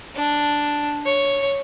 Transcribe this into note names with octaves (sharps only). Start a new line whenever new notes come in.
D4
C#5